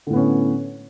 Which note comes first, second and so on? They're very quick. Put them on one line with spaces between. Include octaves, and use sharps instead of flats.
D3 A2 B3 C#4